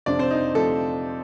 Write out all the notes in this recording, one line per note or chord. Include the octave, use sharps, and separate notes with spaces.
F2 C3 F3 D4 D5
C4 C5
D#4
C3 F3 A3 A4